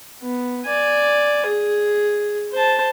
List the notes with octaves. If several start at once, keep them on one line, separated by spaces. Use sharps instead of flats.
B3
D5 G#5
G#4
C5 A5